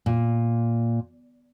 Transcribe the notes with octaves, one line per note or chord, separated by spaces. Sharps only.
A#2